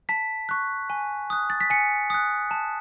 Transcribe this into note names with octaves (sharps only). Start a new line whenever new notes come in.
A5 B6
C#6 F#6
G#5
D#6 F#6
A6
B6
G#5 C#7
D#6 F#6
A5